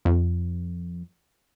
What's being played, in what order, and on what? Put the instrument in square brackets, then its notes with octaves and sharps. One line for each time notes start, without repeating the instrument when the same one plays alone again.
[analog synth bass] F2